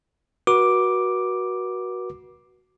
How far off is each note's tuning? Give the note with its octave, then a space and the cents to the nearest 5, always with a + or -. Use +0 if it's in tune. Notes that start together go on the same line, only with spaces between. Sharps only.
F#4 +0 B4 -45 D6 +0